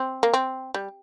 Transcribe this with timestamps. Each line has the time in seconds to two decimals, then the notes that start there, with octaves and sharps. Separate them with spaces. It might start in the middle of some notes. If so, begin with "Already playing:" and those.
Already playing: C4
0.23 A#3
0.34 C4
0.74 G3